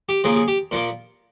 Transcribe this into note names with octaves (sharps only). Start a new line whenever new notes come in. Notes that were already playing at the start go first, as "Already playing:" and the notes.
G4
C#3 F3 A#3 G#4
G#4
G4
A#2 F3 A#3